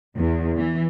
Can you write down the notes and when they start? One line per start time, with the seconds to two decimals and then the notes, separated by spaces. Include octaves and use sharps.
0.17 E2
0.59 E3